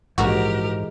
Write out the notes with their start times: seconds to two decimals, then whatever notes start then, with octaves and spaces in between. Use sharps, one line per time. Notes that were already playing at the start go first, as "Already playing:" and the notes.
0.18 A#1 G#2 E3 G#3 F#4 G4 A#4